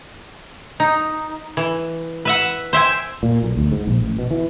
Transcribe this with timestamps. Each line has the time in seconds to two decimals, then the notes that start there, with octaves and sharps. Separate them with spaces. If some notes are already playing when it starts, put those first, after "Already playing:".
0.80 D#4
1.57 E3
2.25 B4 E5 F#5
2.73 C5 E5 G5 G#5
3.23 A#2
3.43 B1
3.57 D2
3.72 G#2
3.87 A#1
4.03 A1
4.19 B2
4.31 E3